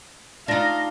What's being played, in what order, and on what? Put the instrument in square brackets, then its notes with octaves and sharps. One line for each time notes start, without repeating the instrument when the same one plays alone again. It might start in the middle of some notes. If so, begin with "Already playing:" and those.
[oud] D4 D#4 [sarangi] F4 [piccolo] A#6